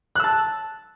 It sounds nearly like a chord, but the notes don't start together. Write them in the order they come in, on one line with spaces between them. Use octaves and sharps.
F#6 E6 A5